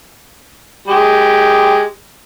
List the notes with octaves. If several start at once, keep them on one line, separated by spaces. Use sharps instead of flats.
G#3 G4